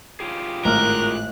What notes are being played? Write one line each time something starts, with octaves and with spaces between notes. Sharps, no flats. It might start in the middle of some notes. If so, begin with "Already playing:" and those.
F4 G4 G#4
G#1 A2 A#4 F6 F#6